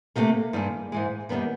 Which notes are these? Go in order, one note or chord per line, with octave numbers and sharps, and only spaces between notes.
C3 F3 A3 A#3
G2 D#3 G#3
G#2 E3 G#3
F#2 D#3 G3 A#3 B3